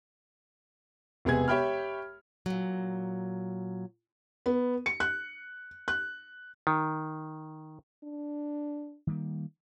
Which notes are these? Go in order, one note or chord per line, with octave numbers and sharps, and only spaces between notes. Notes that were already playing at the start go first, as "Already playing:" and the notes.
E1 C3 B3 G#4 G#6
G4 C#5 E5 G5 B5 F6
A#2 F#3
B3
C#7
F#6
F#6
D#3
D4
D#3 G3 A#3